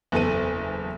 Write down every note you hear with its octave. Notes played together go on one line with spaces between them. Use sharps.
F#1 E2 A4 D#7